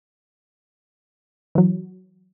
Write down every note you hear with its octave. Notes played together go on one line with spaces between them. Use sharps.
E3 F#3